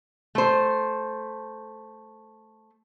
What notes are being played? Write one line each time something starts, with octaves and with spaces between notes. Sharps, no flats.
A3 C5